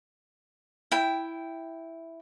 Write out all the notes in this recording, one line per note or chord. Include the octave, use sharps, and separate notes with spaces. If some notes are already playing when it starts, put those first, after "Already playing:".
E4 G5